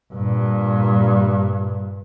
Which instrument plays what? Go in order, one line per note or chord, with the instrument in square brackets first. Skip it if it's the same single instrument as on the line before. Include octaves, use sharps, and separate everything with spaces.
[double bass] G2 A#2